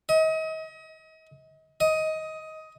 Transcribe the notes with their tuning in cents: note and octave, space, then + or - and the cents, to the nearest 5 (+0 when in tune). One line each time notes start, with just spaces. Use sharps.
D#5 +35
D#5 +15